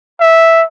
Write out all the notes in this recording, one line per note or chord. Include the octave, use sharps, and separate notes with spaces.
E5